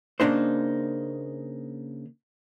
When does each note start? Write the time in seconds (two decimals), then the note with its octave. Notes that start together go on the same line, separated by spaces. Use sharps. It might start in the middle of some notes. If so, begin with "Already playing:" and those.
0.20 C#3 A#3 D4 D#4 C5